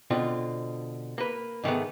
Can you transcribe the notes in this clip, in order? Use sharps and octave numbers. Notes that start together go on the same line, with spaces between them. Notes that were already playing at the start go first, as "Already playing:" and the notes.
B2 D3 C4 F4
A#3 B4
G#2 D#3 A3 B3